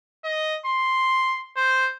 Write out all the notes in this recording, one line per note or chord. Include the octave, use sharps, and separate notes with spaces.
D#5
C6
C5